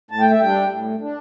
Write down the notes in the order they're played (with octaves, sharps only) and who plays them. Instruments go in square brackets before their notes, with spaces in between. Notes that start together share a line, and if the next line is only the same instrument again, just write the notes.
[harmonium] A2 A5
G5
E5
G3 D4 G5
A2
D4